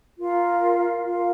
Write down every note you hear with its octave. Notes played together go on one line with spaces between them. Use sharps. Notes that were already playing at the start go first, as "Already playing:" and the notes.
F4 A#4 F5
F4 A#4 F5